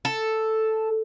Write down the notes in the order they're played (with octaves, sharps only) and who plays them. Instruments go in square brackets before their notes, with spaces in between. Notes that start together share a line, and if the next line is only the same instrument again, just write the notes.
[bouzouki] A4